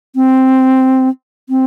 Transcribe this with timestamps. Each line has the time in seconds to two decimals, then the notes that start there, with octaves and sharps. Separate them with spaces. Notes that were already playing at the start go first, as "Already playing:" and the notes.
0.16 C4
1.49 C4